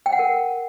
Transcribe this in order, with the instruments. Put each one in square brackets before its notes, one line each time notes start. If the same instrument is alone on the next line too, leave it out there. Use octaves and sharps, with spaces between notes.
[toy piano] G5
F#5
A#4